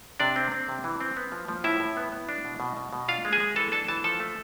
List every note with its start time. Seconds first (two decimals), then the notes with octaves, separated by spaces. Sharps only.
0.20 C3 D4 D5
0.36 C4
0.52 C4
0.69 C3
0.84 E3
1.01 C4
1.17 B3
1.32 F3
1.49 F3
1.64 A2 E4 E5
1.80 A2
1.97 B3
2.12 B3
2.29 D4
2.45 B2
2.60 B2
2.77 B2
2.93 B2
3.08 D4 F4 F5
3.25 G#3
3.33 G#4 G#5
3.40 G#3
3.56 E3 A4 A5
3.72 D4 A4 A5
3.88 E3 A5
4.04 F3 A4 A5
4.20 A3